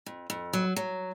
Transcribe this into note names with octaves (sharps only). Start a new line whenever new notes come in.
F2
F2
F#3
F#3